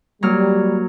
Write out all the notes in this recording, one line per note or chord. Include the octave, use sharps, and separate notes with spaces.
F#3 G3 A#3 F6